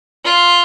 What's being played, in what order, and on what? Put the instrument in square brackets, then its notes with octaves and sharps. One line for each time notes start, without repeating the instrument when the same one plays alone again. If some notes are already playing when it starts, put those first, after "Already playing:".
[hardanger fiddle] F4